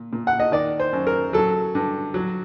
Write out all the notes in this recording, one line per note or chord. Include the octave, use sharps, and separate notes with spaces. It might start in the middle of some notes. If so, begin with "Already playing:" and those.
Already playing: A#2
A#2
F#5
D#5
D#3 D5
C5
F#2
A#4
F#3 A4
G2
F#3